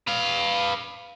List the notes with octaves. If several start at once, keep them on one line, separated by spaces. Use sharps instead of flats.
B4 F5